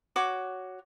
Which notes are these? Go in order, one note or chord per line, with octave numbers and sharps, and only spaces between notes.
F#4 C#5 D6